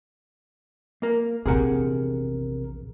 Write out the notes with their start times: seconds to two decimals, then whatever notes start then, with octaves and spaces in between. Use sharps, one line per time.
1.02 A#3 A#4
1.46 A#1 E2 C3 G#4 A#4 F#5